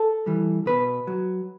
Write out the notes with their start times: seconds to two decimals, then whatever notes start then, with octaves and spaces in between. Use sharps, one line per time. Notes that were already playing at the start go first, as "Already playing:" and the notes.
Already playing: A4
0.26 E3 G3
0.66 B2 B4
1.07 F#3